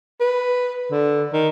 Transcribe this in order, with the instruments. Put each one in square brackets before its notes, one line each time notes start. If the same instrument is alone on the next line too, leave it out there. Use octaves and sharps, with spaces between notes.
[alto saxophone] B4
D3
D#3